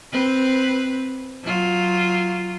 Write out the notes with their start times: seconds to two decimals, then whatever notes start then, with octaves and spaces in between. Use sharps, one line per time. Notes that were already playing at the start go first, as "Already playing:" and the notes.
0.12 C4 B4
1.44 F#3 F4